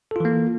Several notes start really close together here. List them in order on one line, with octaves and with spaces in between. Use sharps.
A4 F4 E3 A#3